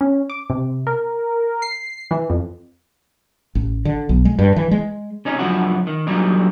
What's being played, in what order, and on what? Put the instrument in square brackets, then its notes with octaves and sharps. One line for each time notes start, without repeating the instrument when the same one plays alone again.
[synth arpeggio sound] C#4
D6
C3
A#4
C7
E3
F2
[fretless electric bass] A1
D3
B1
G#3
G2
E3
G#3
[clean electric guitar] C3 C#4 D#4
C#2 F#2 D3 F3 E4 F#4
D#3
A#2 D3 E3 F#3 G3 D#4